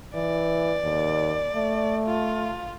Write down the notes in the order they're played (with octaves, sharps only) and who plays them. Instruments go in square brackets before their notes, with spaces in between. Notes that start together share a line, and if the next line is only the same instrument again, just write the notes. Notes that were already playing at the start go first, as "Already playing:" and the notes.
[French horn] E3 [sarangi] D5
[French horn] D#2
A3
[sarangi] F4